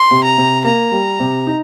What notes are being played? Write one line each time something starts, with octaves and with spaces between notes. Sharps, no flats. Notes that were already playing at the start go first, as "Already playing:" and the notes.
Already playing: C6
C3
A#5
C3
A#3 A#5
G3
C3
D#4